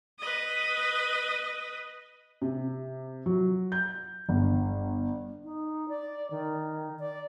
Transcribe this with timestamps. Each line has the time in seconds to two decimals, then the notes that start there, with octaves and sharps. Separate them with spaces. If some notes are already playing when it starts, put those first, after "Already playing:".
0.20 B4 D#5
2.42 C3
3.26 F#3
3.72 G6
4.29 G1
5.44 D#4
5.88 D5
6.31 D#3
6.99 D5